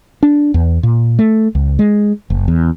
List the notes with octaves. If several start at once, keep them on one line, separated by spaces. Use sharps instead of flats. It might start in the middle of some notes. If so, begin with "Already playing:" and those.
D4
E2
A#2
A3
C#2
G#3
F#1
E2